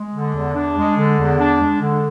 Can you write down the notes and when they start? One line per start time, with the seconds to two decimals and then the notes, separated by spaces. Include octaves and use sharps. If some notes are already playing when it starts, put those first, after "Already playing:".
Already playing: G#3
0.13 D3
0.34 E2
0.55 D4
0.76 G#3
0.97 D3
1.18 E2
1.39 D4
1.60 G#3
1.82 D3